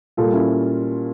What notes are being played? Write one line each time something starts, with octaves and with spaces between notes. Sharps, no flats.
A#2 G3 F4 A4
C#4 E4